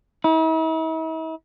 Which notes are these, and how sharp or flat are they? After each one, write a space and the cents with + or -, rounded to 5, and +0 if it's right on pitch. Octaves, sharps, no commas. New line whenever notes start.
E4 -45